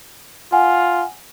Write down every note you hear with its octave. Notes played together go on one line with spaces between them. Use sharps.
F4 F#5 G#5